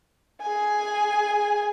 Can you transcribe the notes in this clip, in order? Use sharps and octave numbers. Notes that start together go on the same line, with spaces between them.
G#4 G#5